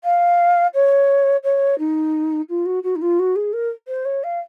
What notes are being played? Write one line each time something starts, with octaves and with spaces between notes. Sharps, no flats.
F5
C#5
C#5
D#4
F4
F#4
F#4
D#4
F4
F#4
G#4
A#4
C5
C#5
F5